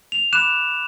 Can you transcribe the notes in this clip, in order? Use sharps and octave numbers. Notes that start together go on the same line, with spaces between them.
F7
B5 D6 F#6 E7